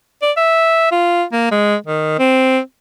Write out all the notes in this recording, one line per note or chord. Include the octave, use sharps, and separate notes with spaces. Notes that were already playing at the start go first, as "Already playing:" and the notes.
D5
E5
F4
A#3
G#3
D#3
C4